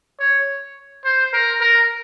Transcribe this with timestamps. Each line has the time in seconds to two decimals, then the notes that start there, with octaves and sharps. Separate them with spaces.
0.20 C#5
1.05 C5
1.33 A#4
1.61 A#4